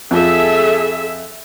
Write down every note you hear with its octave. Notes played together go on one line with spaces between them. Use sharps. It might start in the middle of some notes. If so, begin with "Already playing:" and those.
F2 F3 G#4 A4 E5